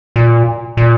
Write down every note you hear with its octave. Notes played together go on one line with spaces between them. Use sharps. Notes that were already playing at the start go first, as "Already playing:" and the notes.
A#2
A#2